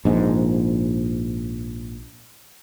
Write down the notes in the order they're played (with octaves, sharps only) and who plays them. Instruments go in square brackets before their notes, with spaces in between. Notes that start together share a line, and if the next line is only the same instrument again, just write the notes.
[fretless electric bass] A#1 G#2